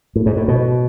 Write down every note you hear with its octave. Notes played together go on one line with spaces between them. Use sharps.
A2
G#2
A2
B2